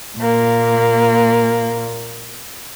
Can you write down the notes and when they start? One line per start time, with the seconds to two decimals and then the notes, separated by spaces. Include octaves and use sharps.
0.17 A#2 A#3